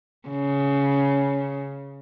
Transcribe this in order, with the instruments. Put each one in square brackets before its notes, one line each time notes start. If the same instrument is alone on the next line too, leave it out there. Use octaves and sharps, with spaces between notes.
[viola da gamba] C#3